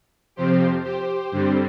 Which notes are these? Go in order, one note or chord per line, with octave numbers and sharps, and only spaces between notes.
F2 C3 F3 C4 G4 C5
G4 C5
G2 D3 G3 C4